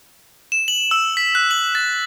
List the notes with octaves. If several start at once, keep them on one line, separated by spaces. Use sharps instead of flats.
E7
F#7
E6
B6
F#6
F#7
A6